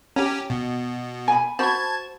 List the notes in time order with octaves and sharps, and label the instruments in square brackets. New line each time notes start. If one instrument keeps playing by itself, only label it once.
[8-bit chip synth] C#4 G4 [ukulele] A#5
[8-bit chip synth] B2
[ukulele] G#5 B5
[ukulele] F#4 C5 B5 [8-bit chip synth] A5 G#6